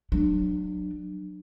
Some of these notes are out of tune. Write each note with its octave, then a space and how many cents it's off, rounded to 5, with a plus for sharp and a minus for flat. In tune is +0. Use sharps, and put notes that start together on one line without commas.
F#3 +0 D4 +30